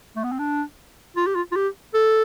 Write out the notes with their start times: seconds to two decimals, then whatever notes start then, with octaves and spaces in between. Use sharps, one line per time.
0.16 A3
0.24 B3
0.32 C4
0.39 D4
1.17 F4
1.27 G4
1.36 F4
1.52 F4
1.56 G4
1.94 A4